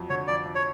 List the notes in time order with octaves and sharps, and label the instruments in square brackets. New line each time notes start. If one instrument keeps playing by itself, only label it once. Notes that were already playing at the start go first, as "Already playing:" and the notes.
Already playing: [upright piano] F2 F#3
[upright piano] D3 [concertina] C#5
[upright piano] F2 [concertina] D5
[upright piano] F2
[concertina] C#5